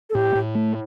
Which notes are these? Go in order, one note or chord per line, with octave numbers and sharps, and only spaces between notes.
A4
A2 G4
A2
A3